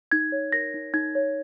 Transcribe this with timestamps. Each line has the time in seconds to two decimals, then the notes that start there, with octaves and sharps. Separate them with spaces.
0.12 D#4 G#6
0.32 C#5
0.52 A#4 A#6
0.74 D#4
0.94 D#4 G#6
1.15 C#5